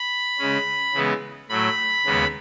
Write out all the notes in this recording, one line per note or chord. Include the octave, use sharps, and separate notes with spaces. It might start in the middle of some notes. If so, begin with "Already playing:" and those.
Already playing: B5
C#3 G#3 C#4
C#3 E3 G#3 B3
A2 F#3 A3 B5
D#2 C#3 G#3 B3